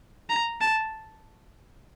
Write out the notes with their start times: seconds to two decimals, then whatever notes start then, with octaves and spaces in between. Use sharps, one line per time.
0.29 A#5
0.61 A5